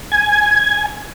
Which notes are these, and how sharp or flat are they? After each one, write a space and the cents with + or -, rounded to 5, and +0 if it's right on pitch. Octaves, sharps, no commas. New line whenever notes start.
G#5 +5